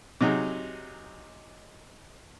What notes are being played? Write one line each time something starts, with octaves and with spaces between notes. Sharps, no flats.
C3 F#3 D#4 G#4